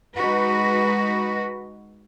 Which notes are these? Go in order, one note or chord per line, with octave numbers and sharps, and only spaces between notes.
G#3 D#4 F#4 B4